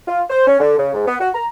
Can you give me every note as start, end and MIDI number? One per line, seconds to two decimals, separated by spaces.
0.08 0.22 65
0.30 0.46 72
0.47 0.59 61
0.60 0.76 50
0.78 0.93 49
0.94 1.06 44
1.07 1.15 59
1.20 1.30 66
1.35 1.47 82